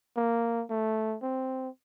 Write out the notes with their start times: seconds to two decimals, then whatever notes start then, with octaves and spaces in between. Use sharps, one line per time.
0.17 A#3
0.70 A3
1.22 C4